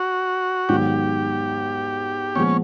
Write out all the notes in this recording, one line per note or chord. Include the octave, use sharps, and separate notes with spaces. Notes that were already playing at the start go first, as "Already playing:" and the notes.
Already playing: F#4
G#2 D#3 F#3 B3 G4
A#2 F3 G#3 B3 C#4